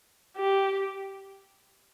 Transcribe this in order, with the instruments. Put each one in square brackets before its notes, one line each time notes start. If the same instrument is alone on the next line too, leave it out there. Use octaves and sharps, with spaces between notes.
[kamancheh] G4